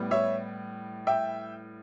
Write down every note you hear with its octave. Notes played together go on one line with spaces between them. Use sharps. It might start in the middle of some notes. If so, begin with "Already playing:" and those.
Already playing: A2 G3 B3
C#5 E5
E5 G5